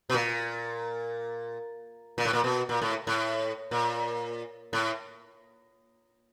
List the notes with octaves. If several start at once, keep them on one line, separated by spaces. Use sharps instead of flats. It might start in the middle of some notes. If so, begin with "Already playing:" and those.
B2
A#2
A#2
A2
A#2
B2
A#2
A2
A2
A#2
A2